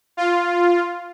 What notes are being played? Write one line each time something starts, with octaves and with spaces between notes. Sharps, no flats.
F4